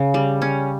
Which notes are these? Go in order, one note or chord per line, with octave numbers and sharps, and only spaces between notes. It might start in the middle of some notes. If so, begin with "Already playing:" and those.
Already playing: C#3
G3
C#4